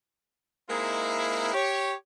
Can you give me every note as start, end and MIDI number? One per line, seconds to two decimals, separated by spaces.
0.70 1.52 56
0.70 1.52 58
0.70 1.52 60
0.70 1.52 63
0.70 1.52 64
1.54 1.94 67
1.54 1.94 73